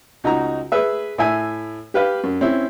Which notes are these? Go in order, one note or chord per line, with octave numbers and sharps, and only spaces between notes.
C#2 D#4 F#4 A#5
G#4 B4 E5
A2 E5 G#5
G4 B4 F5
F#2
C4 C#4 E4